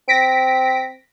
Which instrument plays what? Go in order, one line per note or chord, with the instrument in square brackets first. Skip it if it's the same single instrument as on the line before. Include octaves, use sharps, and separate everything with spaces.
[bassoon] C4 [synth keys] A#6 B6 D7